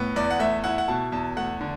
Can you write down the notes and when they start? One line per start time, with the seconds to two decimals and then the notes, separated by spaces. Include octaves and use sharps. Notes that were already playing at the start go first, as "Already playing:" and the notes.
Already playing: A2 B3
0.16 E2 D5
0.30 F#5
0.40 A3 E5
0.64 E4 F#5
0.78 F#5
0.88 B2 A5
1.12 E2 A5
1.37 A3 F#5
1.61 D3